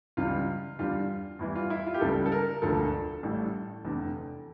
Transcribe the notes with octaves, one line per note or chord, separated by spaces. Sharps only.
C#2 C#3 E3 G3 F4
E2 D3 G3 F4
E2 E3 G3 E4
F4
E4
F4
G4
C#2 C#3 G3 A4
A4
A#4
E1 D2 D3 F3 A4
A1 A2 G3
F1 E2 D3